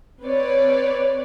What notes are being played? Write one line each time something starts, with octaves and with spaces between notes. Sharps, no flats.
C4 B4 C#5 D5